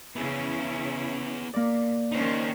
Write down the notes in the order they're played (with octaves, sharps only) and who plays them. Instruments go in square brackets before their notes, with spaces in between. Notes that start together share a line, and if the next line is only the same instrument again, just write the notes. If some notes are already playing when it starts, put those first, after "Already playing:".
[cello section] C#3 C#4 E4 [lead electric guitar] B3 G#4
[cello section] A#2 [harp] A#3 D5
[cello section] D#3 C#4 C5 [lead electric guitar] D#4 C#5